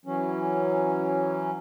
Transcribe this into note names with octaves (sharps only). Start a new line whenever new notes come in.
E3 F#3 C#4